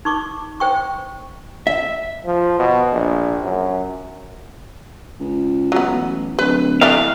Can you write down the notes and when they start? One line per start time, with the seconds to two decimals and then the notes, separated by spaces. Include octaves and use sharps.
0.05 D#4 C#6 D6
0.60 C5 G5 C#6
1.67 E5
2.26 F3
2.59 B2
2.92 A#1
3.44 F#2
5.20 C#2
5.72 F#3 B3
5.91 A1
6.39 D1 B4
6.81 E3 A3 D4 F5